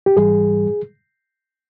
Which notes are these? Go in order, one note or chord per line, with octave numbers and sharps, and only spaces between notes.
G4
G#2 E3 G3 G#4